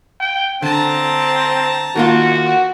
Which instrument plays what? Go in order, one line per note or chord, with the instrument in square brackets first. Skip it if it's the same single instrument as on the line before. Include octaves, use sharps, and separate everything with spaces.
[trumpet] G5
[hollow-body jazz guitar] D3 [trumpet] C4 [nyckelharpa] A5 A#5
[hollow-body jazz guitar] D#3 A#3 F4 [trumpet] F#4